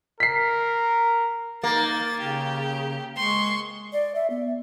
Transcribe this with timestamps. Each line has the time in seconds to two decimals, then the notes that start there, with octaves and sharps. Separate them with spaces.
0.20 A#4 B6 C7
1.64 A#3 D#4 A6
2.20 C#3 G4
3.17 G#3 C6 C#6
3.93 D5
4.15 E5
4.30 B3